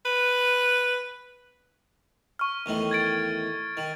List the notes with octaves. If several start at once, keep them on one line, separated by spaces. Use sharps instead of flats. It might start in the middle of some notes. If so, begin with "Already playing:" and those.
B4
C#6 F6
E2 A2 D#3
G#6 A6 D7
D#3